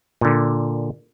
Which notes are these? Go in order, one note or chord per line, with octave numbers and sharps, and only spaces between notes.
A#2 D3